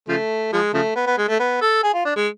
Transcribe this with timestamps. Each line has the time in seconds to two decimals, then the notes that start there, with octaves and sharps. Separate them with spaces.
0.09 C#3 F3 A3
0.53 F3 G#3
0.74 C#3 F3 A3
0.96 B3
1.07 B3
1.18 G#3
1.28 A3
1.40 B3
1.62 A4
1.83 G#4
1.94 F4
2.05 D4
2.16 G#3